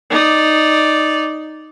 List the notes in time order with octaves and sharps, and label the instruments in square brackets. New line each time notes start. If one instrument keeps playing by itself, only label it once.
[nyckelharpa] D#4 D5